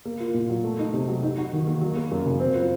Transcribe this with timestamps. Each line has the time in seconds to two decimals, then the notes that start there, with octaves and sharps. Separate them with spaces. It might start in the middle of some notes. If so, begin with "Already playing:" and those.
0.05 A#3
0.20 F4
0.34 A#2
0.50 F#3
0.64 A3
0.79 D#4
0.94 C3
1.09 F#3
1.23 D#4
1.38 F#4
1.53 D#3
1.67 A#3
1.81 F#3
1.97 A#3
2.11 F#2
2.26 C#3
2.40 C4
2.55 F4